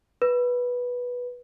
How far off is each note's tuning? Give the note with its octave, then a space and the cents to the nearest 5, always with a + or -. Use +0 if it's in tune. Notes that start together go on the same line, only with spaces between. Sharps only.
B4 -10